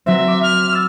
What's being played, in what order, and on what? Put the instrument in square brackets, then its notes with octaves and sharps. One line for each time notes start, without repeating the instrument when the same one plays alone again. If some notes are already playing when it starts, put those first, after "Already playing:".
[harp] F#3 C4 [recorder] E5
[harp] D6
[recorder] F6
[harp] E6 A6